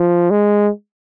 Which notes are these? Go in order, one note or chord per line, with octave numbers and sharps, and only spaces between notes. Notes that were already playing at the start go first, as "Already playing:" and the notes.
Already playing: F3
G#3